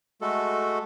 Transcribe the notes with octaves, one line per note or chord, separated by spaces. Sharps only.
G#3 A3 F#4 A4